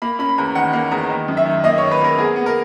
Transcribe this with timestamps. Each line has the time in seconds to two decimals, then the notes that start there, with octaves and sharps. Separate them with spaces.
0.02 A#3 B5
0.19 C#4 B5
0.29 B5
0.38 E2 A#5
0.55 D#3 F#5
0.73 A#3
0.92 E2 A#5
1.10 D#3
1.28 F#2
1.37 E5
1.46 D#3
1.64 A#3 D#5
1.78 C#5
1.83 D#3
1.91 B4
2.01 A#3 A#4
2.18 B3 G#4
2.36 B3
2.46 A#4